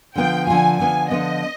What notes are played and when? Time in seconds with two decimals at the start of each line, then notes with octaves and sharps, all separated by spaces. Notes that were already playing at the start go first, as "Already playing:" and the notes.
0.16 D3 F3 B3 F4 G5
0.47 D3 F3 B3 F4 G#5
0.79 D3 F3 B3 F4 G#5
1.10 D3 F3 B3 F4 D#5